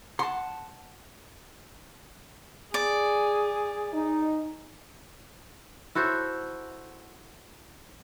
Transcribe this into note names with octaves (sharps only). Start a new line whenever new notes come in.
F#5 A5 C6
G#4 D5
D#4
E4 F#4 A4 C5